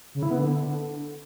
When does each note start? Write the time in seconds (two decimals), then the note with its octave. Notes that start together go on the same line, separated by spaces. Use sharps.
0.15 C#3
0.23 E4
0.31 B3
0.38 D3